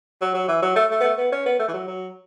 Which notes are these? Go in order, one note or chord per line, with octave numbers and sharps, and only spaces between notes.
F#3
F#3
E3
F#3
A3
A3
B3
A3
B3
C#4
B3
A3
E3
F#3
F#3